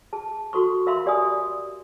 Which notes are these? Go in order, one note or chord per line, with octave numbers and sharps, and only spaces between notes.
G#4 A5
F#4 A4 C6 C#6
A#4 E5 F5 B5 C6
G4 D5 G#5 D#6